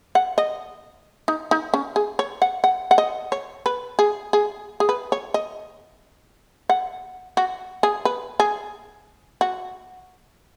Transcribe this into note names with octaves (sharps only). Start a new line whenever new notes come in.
F#5
D#5
D#4
D#4
C#4
G#4
C#5
F#5
F#5
F#5
D#5
C#5
B4
G#4
G#4
G#4
B4
C#5
D#5
F#5
F#4
G#4
B4
G#4
F#4